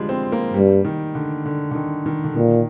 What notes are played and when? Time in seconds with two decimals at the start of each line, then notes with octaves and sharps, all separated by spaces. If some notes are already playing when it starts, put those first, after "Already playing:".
Already playing: D3 F3 G3 G#3
0.09 C4
0.32 A#3
0.54 G2 G3
0.85 D#3
1.15 D3
1.46 D3
1.71 D3
1.75 D#3
2.06 D#3
2.24 D3
2.35 A#2 D#3